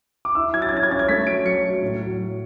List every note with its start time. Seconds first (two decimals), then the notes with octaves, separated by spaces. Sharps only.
0.25 D6
0.35 E4 E6
0.54 F#3 G#6
0.62 A6
0.69 G#6
0.72 C#4 A6
0.83 G#6
0.91 C#4 A6
0.99 G#6
1.09 A3 B6
1.27 F#3 D7
1.45 F#3 C#7
1.64 F#3
1.82 A2
2.01 F#3
2.18 F#3